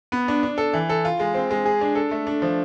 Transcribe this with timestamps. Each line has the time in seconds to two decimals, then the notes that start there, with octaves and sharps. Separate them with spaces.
0.12 B3
0.28 D4
0.43 D4
0.58 A4
0.73 E3
0.89 A4
1.05 F4
1.20 G#3
1.34 C4
1.51 G#3
1.65 G#4
1.81 D4
1.95 A4
2.11 A3
2.27 D4
2.42 F3